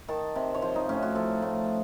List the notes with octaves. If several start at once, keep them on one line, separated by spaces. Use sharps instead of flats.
D#3 A5
C3
C#5
F3 C5
D#4
A2 C#4
F#4
F3 A4
A2